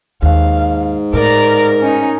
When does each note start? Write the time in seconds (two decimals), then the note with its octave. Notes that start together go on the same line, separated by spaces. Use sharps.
0.22 D#2 G#2 F5
1.13 A2 A#4 D5 A#5
1.79 C#4 D#4